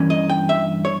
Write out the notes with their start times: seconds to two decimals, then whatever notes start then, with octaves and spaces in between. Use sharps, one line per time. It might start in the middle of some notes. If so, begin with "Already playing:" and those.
Already playing: G2 E3 A#3 C#4
0.10 D#5
0.29 G5
0.49 E5
0.85 C#5